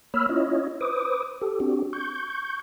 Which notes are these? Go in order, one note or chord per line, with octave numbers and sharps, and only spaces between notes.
A#3 C#5 B5 E6 F6
C#4 E4 F4 C#5 D#5
B4 C5 D6 D#6
G4 A4
C4 D4 F#4 G4
C#6 G6